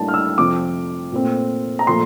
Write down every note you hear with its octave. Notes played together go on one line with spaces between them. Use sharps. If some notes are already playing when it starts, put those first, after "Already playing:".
Already playing: A2 G3 A#3 D4 A5
F6
E6
F2 C3 F3 D6
A#2 A3 C4
A#5
A#2 F3 A3 C6